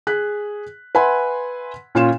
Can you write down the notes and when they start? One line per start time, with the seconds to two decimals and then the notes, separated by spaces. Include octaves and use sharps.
0.07 G#4 F#6 B6
0.95 B4 E5 F#5 G#5 B5 C6
1.95 A#2 C#4 F4 C6 E7